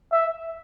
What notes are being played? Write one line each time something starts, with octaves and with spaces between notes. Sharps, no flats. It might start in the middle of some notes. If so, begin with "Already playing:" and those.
E5